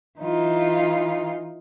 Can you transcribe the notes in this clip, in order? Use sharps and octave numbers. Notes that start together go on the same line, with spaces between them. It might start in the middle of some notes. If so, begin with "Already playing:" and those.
E3 D#4 F4